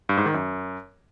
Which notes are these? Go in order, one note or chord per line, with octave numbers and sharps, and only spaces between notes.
G2
G#2
D#3
F#2